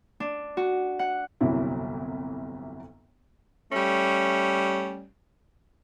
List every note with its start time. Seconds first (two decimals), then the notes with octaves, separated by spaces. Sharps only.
0.20 D4
0.57 F#4
0.99 F#5
1.41 G1 C2 F2 C3 F#3 E4
3.72 G3 A3 C#4